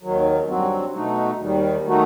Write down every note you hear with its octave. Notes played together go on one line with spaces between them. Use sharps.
D#2 D#3 F#3
G2 F#3 C4 F#4
B2 A3 D#4 F#4
D#2 D#3 G3
D#3 A3 D#4 F#4